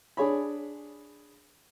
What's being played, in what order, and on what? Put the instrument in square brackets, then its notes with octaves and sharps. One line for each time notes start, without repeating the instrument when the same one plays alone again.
[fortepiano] D4 G#4 C#5 B5